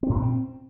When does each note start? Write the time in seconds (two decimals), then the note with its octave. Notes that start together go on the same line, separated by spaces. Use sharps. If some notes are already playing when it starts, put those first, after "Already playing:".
0.03 C4
0.09 A2
0.16 A#2
0.22 C4